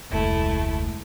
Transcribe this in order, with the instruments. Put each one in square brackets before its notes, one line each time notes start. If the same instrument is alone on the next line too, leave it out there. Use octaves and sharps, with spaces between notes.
[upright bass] F1 D2 [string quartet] G#3 A3 E4